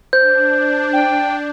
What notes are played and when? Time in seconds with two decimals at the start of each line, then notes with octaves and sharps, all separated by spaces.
0.13 D4 C5 G6
0.93 G5